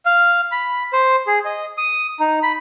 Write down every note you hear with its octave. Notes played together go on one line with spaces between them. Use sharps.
F5
B5
C5
G#4
D#5
D#6
D#4
B5